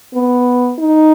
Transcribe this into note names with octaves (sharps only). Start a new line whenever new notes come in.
B3
D#4